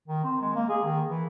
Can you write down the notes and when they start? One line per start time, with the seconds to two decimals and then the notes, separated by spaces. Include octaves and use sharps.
0.08 D#3
0.25 C4
0.42 G#3
0.55 A#3
0.69 G#4
0.85 D#3
1.09 E3